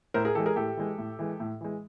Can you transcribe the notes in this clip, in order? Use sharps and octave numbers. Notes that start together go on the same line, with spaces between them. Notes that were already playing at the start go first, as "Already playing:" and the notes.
A2 A#4 C5
G#4 A#4
E3 G#3 G4 A4
G#4 A#4
A2 G4 A4
E3 G#3
A2
E3 G#3
A2
E3 G#3